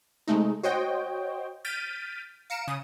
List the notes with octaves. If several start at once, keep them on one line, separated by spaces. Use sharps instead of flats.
C3 G#3 A3 D#4
F#4 C5 C#5 D#5 G5
F6 G6 A6 B6 D7 D#7
F5 A#5 C#7 D7 E7
C#3 D#6